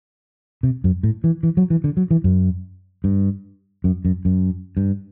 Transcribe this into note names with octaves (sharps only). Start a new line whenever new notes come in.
C3
F#2
A2
E3
E3
F#3
E3
D3
F#3
E3
F#2
G2
F#2
F#2
F#2
G2